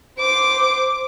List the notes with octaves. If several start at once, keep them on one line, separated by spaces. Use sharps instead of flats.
C5 D6